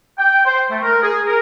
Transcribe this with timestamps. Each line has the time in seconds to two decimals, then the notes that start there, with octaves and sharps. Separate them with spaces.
0.18 G5
0.46 C5
0.70 A3
0.83 A#4
1.03 G#4
1.27 A#4